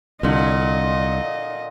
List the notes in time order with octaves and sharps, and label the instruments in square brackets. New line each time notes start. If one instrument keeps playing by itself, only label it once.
[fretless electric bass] C2 [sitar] A#2 D3 [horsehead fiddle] D#5